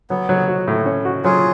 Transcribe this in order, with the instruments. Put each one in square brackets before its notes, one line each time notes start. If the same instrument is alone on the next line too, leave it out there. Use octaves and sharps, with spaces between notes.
[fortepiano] F#3 [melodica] B3
[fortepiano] F#3
F#4
A2
C#4
F#4
[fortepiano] F#3 [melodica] F4 G#4